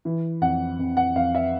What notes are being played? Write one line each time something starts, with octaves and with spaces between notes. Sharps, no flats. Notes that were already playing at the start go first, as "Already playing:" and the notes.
E3
F2 F#5
F2
F#5
F2 F5
E5